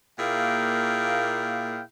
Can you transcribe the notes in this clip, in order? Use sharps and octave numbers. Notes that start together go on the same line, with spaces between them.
A#2 A#3 E4 G#4 F5 G5